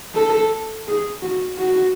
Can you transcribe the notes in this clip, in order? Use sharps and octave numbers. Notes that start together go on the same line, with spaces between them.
A4
G#4
F#4
F#4